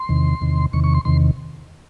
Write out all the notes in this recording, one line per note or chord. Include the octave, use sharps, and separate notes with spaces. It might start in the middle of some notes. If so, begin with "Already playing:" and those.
Already playing: C6
E2 C3 D#3
E2 C3 D#3
E2 C3 D#3 C#6
C#6
C6
E2 C3 D#3 C6